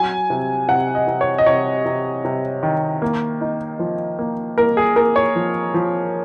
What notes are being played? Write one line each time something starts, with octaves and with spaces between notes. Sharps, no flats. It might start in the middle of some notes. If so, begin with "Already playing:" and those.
Already playing: F#3 G#5
C3
C3 F#5
D#5
C3
C#5
D#5
C3 C#5
C3
C3
D#3
A#3
D#4
F3
A#3
A#3 A#4
G#4
A#3 A#4
C#5
F3
F3